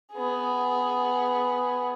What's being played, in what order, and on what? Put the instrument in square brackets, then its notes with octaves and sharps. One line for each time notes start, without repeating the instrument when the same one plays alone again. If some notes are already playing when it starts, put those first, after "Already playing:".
[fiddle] B3 G#4